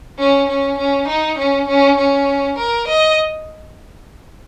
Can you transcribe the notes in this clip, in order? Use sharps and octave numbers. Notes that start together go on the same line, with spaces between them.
C#4
C#4
C#4
D#4
C#4
C#4
C#4
A#4
D#5